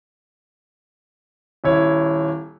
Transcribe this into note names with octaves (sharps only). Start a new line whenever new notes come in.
D#1 E4 C#5